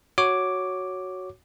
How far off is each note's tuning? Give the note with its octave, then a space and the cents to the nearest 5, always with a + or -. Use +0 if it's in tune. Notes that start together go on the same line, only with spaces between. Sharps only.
F#4 +0 C#5 +0 D6 +0